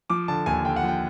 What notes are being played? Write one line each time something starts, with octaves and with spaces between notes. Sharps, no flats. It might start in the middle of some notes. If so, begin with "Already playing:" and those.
F3 D6
D3 A5
D#2 G#5
D3 G5
F#5
F3 G5